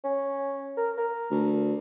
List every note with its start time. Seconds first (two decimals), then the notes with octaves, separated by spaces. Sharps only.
0.04 C#4
0.77 A#4
0.98 A#4
1.31 D2